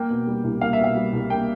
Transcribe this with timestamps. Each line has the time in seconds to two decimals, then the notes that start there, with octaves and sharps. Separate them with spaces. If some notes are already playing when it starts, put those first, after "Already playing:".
Already playing: A#3 G5
0.10 B2
0.27 G3
0.44 C2
0.61 A#3 F5
0.73 E5
0.79 B2
0.84 F5
0.96 G3
1.13 C2
1.30 A#3 G5